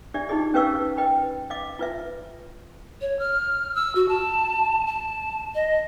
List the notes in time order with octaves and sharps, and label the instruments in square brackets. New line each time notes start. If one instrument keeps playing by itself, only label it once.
[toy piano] D4 G4 D5 E5
D#4 F4 G4 G#4 D#5
C#4 G4 B4 F5 C#6 E6
B4 D#5 G5 B5
D#5 F5 D6
F4 B4 E5
[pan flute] C#5
F6
E6
F#4
A5
A5
D#5